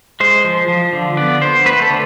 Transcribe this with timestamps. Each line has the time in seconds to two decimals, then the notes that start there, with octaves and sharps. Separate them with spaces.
0.20 G#3 C5
0.45 F3
0.68 F3
0.93 D3
1.17 B3 D5
1.41 B3 C5
1.66 A3 B4
1.82 A4
1.90 D3